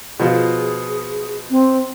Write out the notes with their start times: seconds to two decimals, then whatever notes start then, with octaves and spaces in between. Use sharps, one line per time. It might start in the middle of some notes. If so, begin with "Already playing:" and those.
0.20 B2 F3 F4 G#4
1.51 C4